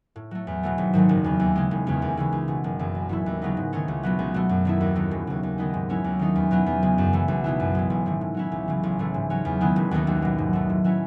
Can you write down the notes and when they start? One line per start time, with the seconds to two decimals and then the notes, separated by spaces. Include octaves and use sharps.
0.16 A2
0.31 F#3 A3
0.47 E2
0.63 B2 F#3 A3
0.78 G#1
0.93 G#2 D#3 F#3 A3
1.09 F#1
1.24 E2 C#3
1.40 D#2
1.56 C#3 G#3
1.71 E1
1.86 E2 C#3 G#3 C#4
2.02 D#2
2.17 C#3 E3 G#3
2.32 C#2
2.48 B2 A3
2.64 F#1
2.79 F#2 E3 G#3
2.95 B1
3.09 A2 E3 A3 E4
3.26 D#2
3.41 C#3 F#3 B3 D#4
3.57 G#2
3.73 D#3 A3 C#4
3.88 C#2
4.03 B2 F#3 B3
4.19 C#2
4.34 B2 A3
4.49 F#2
4.65 D#3 A3 E4
4.81 D#2
4.96 D#3 F#3 A3
5.11 E1
5.27 D#2 C#3
5.43 D#2
5.58 D#3 G#3 B3 D#4
5.74 G#2
5.89 F#3 C#4 E4
6.04 D#2
6.19 D#3 A3 D#4
6.35 E2
6.51 B2 F#3 B3 E4
6.66 E2
6.83 C#3 G#3
6.98 F#2
7.13 E3 A3
7.28 B1
7.44 B2 G#3 B3 E4
7.60 F#2
7.75 E3 G#3
7.90 A1
8.06 G#2 D#3 A3
8.21 A2
8.34 F#3 C#4 E4
8.52 C#2
8.68 C#3 E3
8.83 A1
8.99 A2 E3 A3
9.14 G#2
9.30 F#3 C#4
9.45 E2
9.61 D#3 G#3 B3 E4
9.76 E1
9.91 D#2 D#3 A3 D#4
10.07 B1
10.22 B2 F#3
10.38 G#2
10.53 F#3 A3
10.69 A2
10.84 F#3 A3 C#4 E4